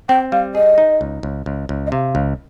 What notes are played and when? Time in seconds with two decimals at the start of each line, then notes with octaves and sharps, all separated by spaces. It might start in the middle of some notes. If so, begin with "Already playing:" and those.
0.09 C4 G5
0.32 G3 F5
0.55 G#4 D#5
0.78 D#4
1.01 C#2
1.23 C#2
1.46 C#2
1.69 C#2
1.87 D#5
1.92 C3 F5
2.15 C#2